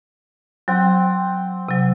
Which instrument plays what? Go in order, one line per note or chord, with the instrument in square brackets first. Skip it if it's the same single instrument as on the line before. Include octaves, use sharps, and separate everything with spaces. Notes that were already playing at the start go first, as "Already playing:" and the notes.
[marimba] F#3 [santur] C4 F#5 G5
[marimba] C3 F#3